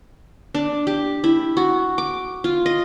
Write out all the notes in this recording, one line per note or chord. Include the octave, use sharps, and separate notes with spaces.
D4
G4
E4
F#4
D6
F4
D#5